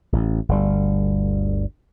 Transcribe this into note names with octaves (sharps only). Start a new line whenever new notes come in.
A1
G1 D2 G3